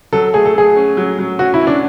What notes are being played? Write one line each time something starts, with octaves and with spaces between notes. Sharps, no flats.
F#3 A4
A3 G#4
A4
A3 G#4
C#4
F#3
F#3
C#4 F#4
E4
C#4
D4